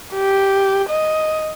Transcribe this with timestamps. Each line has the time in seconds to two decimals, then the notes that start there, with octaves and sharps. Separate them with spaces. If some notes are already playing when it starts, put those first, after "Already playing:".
0.14 G4
0.89 D#5